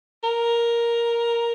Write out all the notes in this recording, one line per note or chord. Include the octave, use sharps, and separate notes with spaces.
A#4